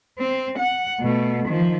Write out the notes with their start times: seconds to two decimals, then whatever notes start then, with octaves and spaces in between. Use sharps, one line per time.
0.19 C4
0.58 F#5
1.00 B2 A3
1.47 D#3 F3